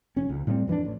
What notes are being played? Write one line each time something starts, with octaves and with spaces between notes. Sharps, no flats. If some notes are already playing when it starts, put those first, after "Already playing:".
F1 C#4
C#2
A2 G3 B3 C4
F2 E3 A#3 D4
A1